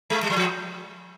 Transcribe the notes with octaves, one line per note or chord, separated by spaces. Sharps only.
G#3
G3
F#3
F3